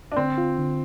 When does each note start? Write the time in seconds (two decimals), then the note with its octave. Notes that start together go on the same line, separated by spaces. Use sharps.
0.12 D4
0.16 D3 C4
0.38 F4
0.58 D3